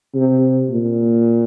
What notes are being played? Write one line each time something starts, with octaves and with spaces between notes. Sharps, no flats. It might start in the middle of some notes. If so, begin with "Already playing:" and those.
C3
A#2